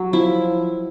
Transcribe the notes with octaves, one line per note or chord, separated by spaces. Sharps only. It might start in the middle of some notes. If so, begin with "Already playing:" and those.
Already playing: F#3
F3 E4